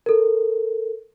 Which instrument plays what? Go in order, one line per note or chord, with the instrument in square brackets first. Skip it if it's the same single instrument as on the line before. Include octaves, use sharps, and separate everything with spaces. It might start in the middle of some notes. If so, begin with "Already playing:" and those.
[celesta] A4 A#4